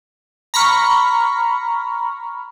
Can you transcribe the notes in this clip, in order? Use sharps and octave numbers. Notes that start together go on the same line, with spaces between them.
A#5 B5 C#6 F6